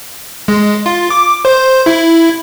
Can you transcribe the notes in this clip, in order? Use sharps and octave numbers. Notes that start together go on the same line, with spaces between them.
G#3
F4
D6
C5
E4